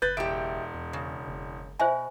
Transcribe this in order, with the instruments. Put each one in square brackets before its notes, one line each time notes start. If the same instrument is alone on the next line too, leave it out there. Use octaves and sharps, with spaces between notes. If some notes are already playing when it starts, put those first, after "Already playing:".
[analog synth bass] F#1 [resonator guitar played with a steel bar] B4 [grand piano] G6 A6
[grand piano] E1 D7 [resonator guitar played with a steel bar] G4 E5
[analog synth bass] E2
[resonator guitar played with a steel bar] C#3
[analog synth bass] F#1
[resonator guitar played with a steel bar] B2 [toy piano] C5 E5 G#5